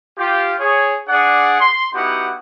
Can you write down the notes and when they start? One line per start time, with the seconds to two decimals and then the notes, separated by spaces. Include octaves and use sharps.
0.19 F4 G4
0.60 G#4 C#5
1.08 D4 G#4 D5 F#5
1.60 C6
1.94 B3 D#4 E4 F#4 G4 F#5